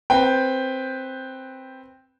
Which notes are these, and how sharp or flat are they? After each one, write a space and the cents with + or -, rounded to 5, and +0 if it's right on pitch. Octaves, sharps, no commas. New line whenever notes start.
C4 +5 B4 +0 G5 +5